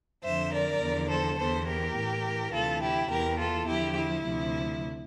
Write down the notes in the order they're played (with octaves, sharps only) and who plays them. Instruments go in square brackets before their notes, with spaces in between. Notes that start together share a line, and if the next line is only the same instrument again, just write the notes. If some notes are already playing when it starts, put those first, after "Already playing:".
[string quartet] F2 D3 F3 C5 E5
A#4 D5
E2 D3 F3
A4 C5
E2 E3 A4 C5
G4 A#4
A2 E3
D2 C3 E3 F4 A4
E4 G4
E2 E3 G4 A#4
F4 A4
E2 D3 F3 E4 G4
E4
D2 C3 F3